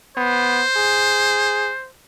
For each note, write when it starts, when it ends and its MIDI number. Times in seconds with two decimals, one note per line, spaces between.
0.17 0.62 59
0.17 1.89 72
0.76 1.71 68